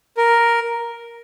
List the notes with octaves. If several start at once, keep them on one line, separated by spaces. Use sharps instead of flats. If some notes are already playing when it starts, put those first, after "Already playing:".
A#4